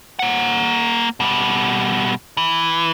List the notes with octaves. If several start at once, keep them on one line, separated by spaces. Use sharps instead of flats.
A#3 F#5
B2 G3
E3